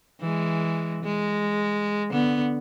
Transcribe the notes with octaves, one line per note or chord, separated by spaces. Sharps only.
E3 G#3
G#3
D3 B3